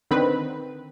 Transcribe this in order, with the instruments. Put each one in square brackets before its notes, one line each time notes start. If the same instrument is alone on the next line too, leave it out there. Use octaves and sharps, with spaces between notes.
[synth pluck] D3 D#3 C4 B4